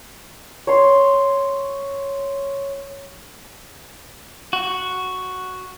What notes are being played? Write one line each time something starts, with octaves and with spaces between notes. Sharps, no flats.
C#5 C6
F#4